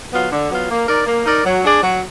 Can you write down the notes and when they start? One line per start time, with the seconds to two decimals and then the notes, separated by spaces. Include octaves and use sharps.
0.12 F#3 B3 F4
0.31 D3
0.50 F#3 B3 F4
0.69 A#3
0.87 D#4 A#4 D5
1.06 A#3
1.25 D#4 A#4 D5
1.45 F#3
1.64 D4 G#4 D5
1.82 F#3